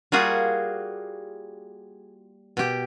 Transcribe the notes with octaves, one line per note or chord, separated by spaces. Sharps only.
G3 A#3 F4 F#4 G#4 F#5
B2 G4